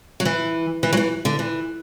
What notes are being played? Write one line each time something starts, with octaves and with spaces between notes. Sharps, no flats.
F#3
E3
E3
F#3
E3
D3
E3